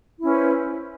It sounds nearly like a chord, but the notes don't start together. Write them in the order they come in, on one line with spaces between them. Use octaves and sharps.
E4 C#4 B4 C5